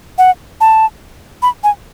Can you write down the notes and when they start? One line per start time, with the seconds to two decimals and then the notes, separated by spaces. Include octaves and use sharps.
0.18 F#5
0.61 A5
1.42 B5
1.64 G#5